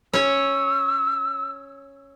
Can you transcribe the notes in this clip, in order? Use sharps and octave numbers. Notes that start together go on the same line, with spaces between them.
C#4 C#5 E6